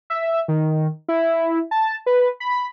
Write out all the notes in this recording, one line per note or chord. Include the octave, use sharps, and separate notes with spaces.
E5
D#3
E4
A5
B4
B5